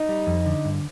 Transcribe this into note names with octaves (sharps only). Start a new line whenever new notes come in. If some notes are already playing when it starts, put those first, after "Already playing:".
Already playing: D#4
G3
F2
D3
G2